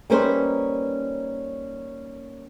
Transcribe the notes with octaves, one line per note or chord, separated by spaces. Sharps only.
G3 A#3 C#4 D#4 B4 C5